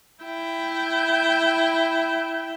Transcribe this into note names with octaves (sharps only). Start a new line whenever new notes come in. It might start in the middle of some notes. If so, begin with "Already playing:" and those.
E4 G5